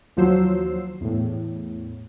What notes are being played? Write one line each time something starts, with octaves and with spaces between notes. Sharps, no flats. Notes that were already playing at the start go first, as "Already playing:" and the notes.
D#2 F3 F#3 C5 E6 C7
E2 A2